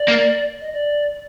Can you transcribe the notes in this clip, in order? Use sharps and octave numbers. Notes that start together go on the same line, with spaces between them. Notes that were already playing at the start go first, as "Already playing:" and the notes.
Already playing: D5
A#3
D#5
D5